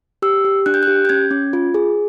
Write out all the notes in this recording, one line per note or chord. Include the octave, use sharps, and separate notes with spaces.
G4 E6
G4
D4 F#6
G6
G4 F#6
G6
C#4 G#6
C#4
F4
G#4